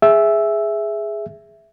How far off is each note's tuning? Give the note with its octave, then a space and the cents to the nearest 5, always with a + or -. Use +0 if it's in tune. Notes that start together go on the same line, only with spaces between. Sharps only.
G#4 +0 E5 +0